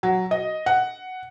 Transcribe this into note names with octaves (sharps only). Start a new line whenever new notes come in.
F#3
D#5
F#5